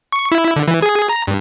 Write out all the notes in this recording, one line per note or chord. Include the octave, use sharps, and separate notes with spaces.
C#6
E4
D3
E3
G#4
A#5
G2